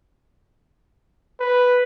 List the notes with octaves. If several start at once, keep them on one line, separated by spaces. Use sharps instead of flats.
B4